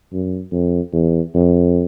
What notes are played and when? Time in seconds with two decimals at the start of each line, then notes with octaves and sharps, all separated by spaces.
0.13 F#2
0.52 F2
0.92 E2
1.34 F2